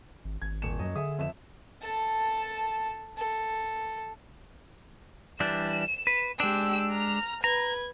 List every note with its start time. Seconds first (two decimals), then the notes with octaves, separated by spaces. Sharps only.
0.25 G#1
0.42 G#1 G#6
0.62 D#1 C#7 E7
0.79 F#2 F#3 D#5
0.95 D3 G#4 E5 D#6
1.18 F2 E5 E7
1.82 A4 A5
3.18 A4
5.40 E3 G3 D4 E7
6.07 B4
6.40 G#3 D4 G4 E6
6.91 A#5 F6
7.44 B4 A#5 G#6